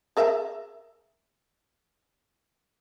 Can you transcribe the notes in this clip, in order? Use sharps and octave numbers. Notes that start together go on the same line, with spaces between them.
G#4 A#4 E5